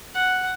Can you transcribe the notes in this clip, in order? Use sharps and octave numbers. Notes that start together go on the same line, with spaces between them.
F#5